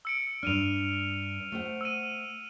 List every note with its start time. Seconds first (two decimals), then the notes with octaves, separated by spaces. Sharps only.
0.05 E6 C#7 D7
0.43 G2 D4 F6 D#7 F7
1.52 A3 C5 F#5
1.81 E6 D#7